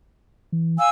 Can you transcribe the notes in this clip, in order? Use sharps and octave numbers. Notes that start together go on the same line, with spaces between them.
E3
F5 G#5 E6